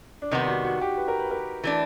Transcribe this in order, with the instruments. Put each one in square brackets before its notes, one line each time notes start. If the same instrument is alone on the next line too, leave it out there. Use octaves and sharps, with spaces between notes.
[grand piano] D4
[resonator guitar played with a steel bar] C3 D#3 G3 B3 [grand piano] D#4
[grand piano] F#4
F#4
G4
B4
A#4
B4
A#4
[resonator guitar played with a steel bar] E3 A3 D4